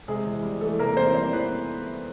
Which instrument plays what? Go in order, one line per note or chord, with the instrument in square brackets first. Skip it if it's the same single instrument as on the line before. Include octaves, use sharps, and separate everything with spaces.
[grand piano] C3 G#3 G#4
E2
G3
E3 A3 A4
C3 A#3 A#4
E2 C4 C5
G3 C4 C5
E3 B3 B4